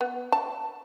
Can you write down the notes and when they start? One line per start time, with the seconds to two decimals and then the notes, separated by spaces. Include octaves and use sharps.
0.01 B3
0.32 A5